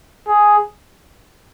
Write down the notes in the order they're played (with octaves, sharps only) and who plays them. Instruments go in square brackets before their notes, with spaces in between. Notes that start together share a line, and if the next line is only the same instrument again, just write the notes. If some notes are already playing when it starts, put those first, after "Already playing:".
[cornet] G#4